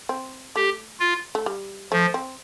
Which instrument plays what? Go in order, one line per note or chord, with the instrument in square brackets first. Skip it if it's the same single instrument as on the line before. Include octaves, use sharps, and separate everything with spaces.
[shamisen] C4
[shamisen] A3 [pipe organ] G4
[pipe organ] F4
[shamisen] A3
G3
[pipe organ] F3 [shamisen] A3
[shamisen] C4